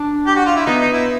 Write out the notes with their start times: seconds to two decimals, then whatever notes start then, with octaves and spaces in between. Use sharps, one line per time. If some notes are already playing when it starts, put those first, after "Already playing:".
Already playing: D4
0.27 G4
0.36 F#4
0.46 F4
0.57 E4
0.67 B3 D#4
0.81 D#4
0.93 E4